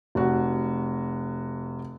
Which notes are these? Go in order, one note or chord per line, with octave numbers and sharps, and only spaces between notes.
F1 F#4